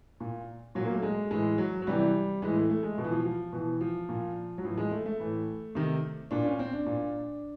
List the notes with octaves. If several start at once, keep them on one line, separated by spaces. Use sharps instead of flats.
A#2
A#2 F#3
A#3
A3
G#3
A2 E3 G#3
F#3
F#3
C3 E3 G3
A2 E3 G#3
A3
A3
G#3
B2 F3
E3
F3
F3
B2 E3
F3
A#2
F#3
A2 E3 F3
G#3
A3
A3
A2 E3
C3 D#3
A#2 D4
C#4
C4
D4
A#2